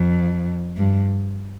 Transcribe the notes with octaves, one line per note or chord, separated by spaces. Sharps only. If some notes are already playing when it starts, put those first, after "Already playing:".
Already playing: F2
G2